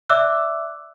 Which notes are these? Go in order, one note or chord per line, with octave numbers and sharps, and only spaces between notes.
D5 E5 D6 E6 F#6